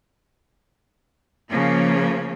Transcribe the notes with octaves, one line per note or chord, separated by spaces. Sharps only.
C#3 F3 A#3